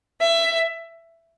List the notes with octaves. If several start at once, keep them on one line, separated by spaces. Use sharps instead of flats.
E5